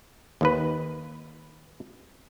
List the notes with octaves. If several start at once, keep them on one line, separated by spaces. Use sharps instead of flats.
D#2 D#3 B4